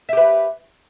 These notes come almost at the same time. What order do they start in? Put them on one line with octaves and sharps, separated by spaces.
E5 G4 B4